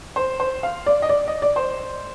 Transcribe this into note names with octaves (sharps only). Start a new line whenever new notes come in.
C5
C5
F5
D5
D#5
D5
D#5
D5
C5